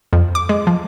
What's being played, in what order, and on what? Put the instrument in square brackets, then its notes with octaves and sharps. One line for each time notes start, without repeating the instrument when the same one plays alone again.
[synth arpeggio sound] F2
D6
G#3
F3